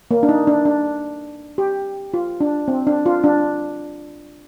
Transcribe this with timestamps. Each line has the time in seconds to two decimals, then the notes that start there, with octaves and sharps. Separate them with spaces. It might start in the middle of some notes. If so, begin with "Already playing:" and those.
0.11 A#3
0.23 D4
0.29 D#4
0.47 D4
0.65 D4
1.58 G4
2.14 F4
2.41 D4
2.68 C4
2.87 D4
3.06 F4
3.24 D4